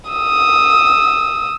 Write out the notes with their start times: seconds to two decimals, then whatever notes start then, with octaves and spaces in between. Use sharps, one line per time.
0.10 D#6 E6